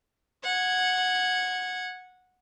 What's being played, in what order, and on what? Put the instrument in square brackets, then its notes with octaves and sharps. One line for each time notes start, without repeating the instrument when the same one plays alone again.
[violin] F#5 G#6